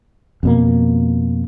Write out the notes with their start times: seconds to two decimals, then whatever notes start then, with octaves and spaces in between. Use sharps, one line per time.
0.43 F2 B2 A#3